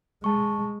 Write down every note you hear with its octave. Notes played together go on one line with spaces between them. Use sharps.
G#3 A5 C#6